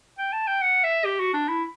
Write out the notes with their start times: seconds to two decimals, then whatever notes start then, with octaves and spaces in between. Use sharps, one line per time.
0.18 G5
0.33 A5
0.47 G5
0.62 F#5
0.84 E5
1.05 G4
1.20 F#4
1.34 D4
1.48 E4